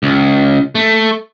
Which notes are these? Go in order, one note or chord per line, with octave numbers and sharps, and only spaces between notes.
C#2
A3